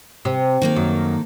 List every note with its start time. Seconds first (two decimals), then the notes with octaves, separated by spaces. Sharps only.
0.25 C3
0.62 D#3 A#3 A4
0.76 F#2